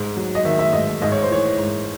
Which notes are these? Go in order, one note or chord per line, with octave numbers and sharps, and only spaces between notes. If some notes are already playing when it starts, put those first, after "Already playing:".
Already playing: G#2
F#3
D#5
D#3 E5
E5
G#2 D#5
G#2 D#5
C#5
C5
E3 C#5
G#2